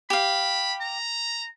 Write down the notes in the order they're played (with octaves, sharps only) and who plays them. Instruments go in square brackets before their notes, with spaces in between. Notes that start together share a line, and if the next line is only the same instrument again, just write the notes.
[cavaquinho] G4 F5 [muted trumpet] B5
[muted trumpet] A#5